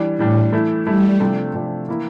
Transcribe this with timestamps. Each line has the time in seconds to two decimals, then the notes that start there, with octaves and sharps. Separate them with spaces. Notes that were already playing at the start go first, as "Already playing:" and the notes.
Already playing: E3 G3 D4
0.19 A2 E3 G3 D4
0.53 E3 A3 E4
0.87 E3 G3 A3 E4
1.20 C3 F3 A3 D4
1.54 C3 F3 A3 D4
1.88 E3 A#3 E4